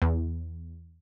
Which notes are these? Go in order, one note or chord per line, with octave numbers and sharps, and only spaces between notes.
E2